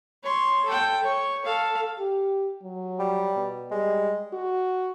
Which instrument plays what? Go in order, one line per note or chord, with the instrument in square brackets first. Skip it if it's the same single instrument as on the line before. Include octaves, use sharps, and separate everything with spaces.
[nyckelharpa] C#5 C6
A4 G5
C#5
A4 F5
[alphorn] G4
F#3
[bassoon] G3
[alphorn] B2
[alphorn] G3 [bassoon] G#3
[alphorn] F#4